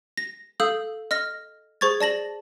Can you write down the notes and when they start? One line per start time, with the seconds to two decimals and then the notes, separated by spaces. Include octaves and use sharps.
0.18 A#6
0.60 A4 F5 D#6 E6 G6
1.11 D#5 F6 A#6
1.81 G#4 C5 C#6 G#6 A6
2.01 D5 A5 A#6 F#7